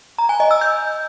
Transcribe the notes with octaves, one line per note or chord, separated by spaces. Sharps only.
A#5
G#5
D#5
E6
G6